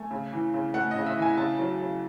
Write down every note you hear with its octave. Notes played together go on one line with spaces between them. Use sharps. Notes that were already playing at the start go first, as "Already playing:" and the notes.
Already playing: A3 G#5
C#3
E3
C#3
A3 F#5
D#5
C#3
E5
E3
G#5
C#3 A5
F#3
C#3